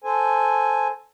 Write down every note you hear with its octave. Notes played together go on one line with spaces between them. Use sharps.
A4 C5 G#5